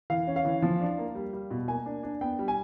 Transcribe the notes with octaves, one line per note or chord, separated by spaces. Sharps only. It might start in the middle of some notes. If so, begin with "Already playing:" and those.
E3 F5
C#4
F5
E3
F3
D4
A#3
G3
G3
B2
A#3 G#5
D4
D4
B3 G5
G3
G#5